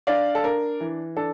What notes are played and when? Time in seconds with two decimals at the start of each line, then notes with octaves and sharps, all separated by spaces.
0.07 D4 D5 F5
0.35 A4
0.44 D4 A#4
0.80 E3
1.16 D4 A4